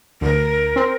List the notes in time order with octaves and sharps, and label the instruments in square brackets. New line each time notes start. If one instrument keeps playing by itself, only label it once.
[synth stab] D2 [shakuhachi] A#4
[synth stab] C4